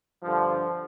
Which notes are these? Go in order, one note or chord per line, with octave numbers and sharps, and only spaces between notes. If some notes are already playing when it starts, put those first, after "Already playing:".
G2 D3 F3